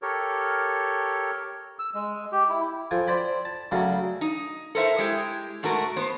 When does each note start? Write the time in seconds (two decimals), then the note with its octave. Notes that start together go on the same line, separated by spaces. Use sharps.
0.02 G4 A4 A#4 C#5
1.79 E6
1.94 G#3
2.32 G4
2.49 E4
2.91 F3 A4 G5 G#5
3.07 C5 D5 G5 B5
3.45 A5
3.71 C#3 F#3 G3 A3 A4 A#4
4.21 D#4
4.75 A4 A#4 C5 D#5 E5
4.98 G#3 E4 G4
5.63 G#2 A3 F#4 A#4
5.97 B3 C5